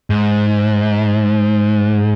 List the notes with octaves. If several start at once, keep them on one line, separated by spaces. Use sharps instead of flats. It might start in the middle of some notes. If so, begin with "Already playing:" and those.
G#2